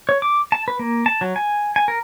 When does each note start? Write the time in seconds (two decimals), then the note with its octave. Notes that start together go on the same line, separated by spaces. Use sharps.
0.09 C#5
0.22 D6
0.52 A5
0.68 B4
0.79 A#3
1.06 A5
1.21 F#3
1.36 G#5
1.76 G#5
1.88 A#4